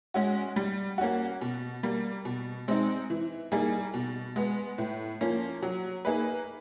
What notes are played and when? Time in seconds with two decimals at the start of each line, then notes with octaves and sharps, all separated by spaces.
0.14 G#3 C#4 F#4
0.56 G3
0.98 A#3 C#4 F#4
1.41 B2
1.83 G3 A#3
2.25 B2
2.68 G#3 C4 D#4
3.10 E3
3.52 G3 A#3 D#4 G#4
3.94 B2
4.36 G#3 B3
4.78 A2
5.21 F3 A#3 C#4
5.63 F#3
6.05 A#3 D#4 G#4 B4